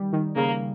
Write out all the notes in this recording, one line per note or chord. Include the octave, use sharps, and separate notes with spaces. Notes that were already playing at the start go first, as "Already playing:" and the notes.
Already playing: D#3 G3
D#3
C#3 A#3